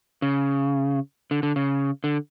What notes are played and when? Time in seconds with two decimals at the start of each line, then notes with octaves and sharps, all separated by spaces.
0.22 C#3
1.31 D3
1.43 D3
1.56 C#3
2.04 D3